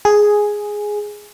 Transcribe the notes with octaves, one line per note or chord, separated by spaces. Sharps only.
G#4